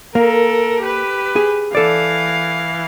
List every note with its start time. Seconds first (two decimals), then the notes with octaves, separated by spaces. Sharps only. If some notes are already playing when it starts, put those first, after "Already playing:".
0.15 A#3 A4 A#4
0.82 G4 B4
1.36 G#4
1.75 E3 A4 D5 F5